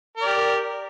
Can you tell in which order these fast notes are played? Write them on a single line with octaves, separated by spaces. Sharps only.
A#4 D5 G4